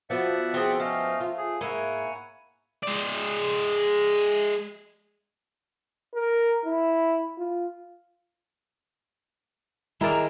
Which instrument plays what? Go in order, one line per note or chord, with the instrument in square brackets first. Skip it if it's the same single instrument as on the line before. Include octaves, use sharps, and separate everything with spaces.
[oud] F3 B3 F#4 [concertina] D5 E5 F#5
[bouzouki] C4 G#4 A4
[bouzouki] A3 [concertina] C#4 D#5 F5
[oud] F4
[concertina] G#4
[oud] G#2 [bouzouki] A#3 E4 [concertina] C#5 F#5 G#5
[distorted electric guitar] G#3 D5
[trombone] A#4
E4
F4
[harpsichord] D#3 G#3 [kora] E4 A#4 D5 [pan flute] A#5